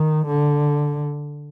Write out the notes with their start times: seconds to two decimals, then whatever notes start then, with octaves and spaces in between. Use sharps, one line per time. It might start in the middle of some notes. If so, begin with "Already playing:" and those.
Already playing: D#3
0.27 D3